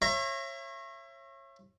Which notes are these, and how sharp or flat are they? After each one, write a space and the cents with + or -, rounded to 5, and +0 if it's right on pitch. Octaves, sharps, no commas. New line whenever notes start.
C#5 -30 E5 +30 A#5 +0